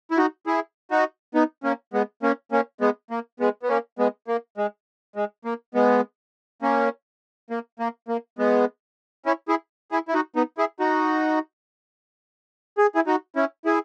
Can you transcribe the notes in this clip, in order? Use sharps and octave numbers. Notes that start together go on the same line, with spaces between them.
E4
D#4 F#4
E4 G#4
D#4 F#4
B3 D#4
A#3 C#4
G#3 B3
A#3 C#4
A#3 C#4
G#3 B3
A#3
G#3 B3
B3
A#3 C#4
G#3 B3
A#3
G#3
G#3
A#3
G#3 B3
A#3 C#4
A#3
A#3
A#3
G#3 B3
C#4 E4
E4 G#4
E4 G#4
E4
D#4 F#4
B3 D#4
E4 G#4
D#4 F#4
G#4
E4 G#4
D#4 F#4
C#4 E4
E4 G#4